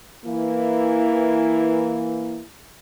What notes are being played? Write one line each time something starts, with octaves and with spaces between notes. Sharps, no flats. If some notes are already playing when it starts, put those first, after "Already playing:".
E3 A#3 E4